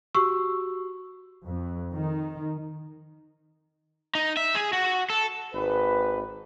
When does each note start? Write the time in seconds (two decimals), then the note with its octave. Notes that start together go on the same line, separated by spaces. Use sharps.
0.15 F#4 G4 C#6 E6
1.46 F2
1.94 D#3
4.15 D#4
4.37 E5
4.55 G#4
4.73 F#4
5.10 A4
5.54 G#1 B4